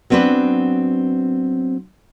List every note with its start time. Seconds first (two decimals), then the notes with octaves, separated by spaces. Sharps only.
0.10 F#3 B3 C4 D4 B4